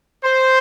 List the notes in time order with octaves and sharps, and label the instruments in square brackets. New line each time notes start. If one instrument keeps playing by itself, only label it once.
[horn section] C5